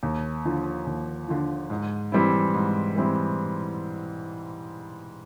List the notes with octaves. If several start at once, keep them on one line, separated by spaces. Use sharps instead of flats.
D#2
D3 F3
D#2
D3 F3
G#2
E3 G3 C4 E4
G#2
E3 G3 C4 E4